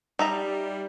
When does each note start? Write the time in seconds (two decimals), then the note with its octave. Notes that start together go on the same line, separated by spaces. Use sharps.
0.19 G3 D#4 E5 A#5